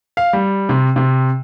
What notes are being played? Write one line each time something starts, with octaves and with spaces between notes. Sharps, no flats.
F5
G3
C3
C3